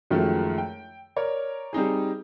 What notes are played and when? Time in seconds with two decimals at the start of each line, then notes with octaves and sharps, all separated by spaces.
0.11 F#2 D#3 F3 G#3 A3
0.58 G5
1.16 A#4 C#5 D5
1.73 G3 C4 D#4 G#4